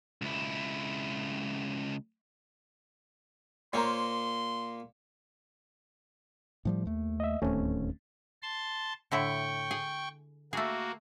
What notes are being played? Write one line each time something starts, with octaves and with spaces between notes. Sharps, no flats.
C#2 E4
A#2 A#3 A#4 C5 C#5 C6
A2 F3 G3
D#2 A3
D#5 E5
D1 D#2 A3 C4 C#4
A5 C6
A2 D3 E4 G5 C#6
G#4
A3 A#3 F#4 G#4